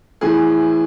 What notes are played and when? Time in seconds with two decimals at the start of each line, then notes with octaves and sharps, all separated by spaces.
0.21 A2 E3 G#4